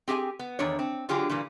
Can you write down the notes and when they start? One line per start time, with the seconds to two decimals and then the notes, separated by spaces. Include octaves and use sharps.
0.08 C4 G4 G#4 E5 G#5
0.39 B3
0.59 E2 D#3 D4 C#5
0.79 C4
1.09 D3 F#3 F4 G4 G#4
1.29 A#2 E3 G3 A#3